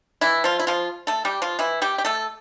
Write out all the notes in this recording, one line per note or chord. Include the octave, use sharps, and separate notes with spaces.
E3 E4
F3 F4
E4
F3 F4
A3 A4
G3 G4
F3 F4
E3 E4
G3 G4
G4
A3 A4